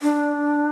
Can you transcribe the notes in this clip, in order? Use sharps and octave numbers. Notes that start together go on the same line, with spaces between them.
D4